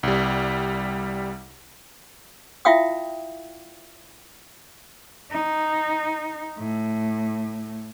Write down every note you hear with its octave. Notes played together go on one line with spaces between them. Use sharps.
C2 G3
E4 F4 E5 F5 G5 D#6
D#4
A2